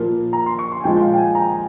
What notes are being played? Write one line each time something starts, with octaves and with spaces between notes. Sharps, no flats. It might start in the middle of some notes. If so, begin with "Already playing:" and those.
Already playing: A#2 F3 A#3
A#5
C6
C#6
C6
G#5
A#2 F3 G#3 G5
F5
G5
G#5
A#5